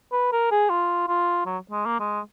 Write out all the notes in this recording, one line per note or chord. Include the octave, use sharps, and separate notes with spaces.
B4
A#4
G#4
F4
F4
F#3
G#3
A#3
G#3